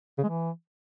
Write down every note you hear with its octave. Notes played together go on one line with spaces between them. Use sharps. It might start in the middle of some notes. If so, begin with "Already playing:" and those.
C#3
G#3
E3